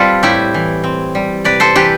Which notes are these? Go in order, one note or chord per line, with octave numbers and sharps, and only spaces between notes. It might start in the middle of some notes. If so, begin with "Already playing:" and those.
Already playing: G3 C4 F4 A4 B4
A2 E4 G4
E3
C4
G3
C3 B4 D5
A4 C5
E3 G4 B4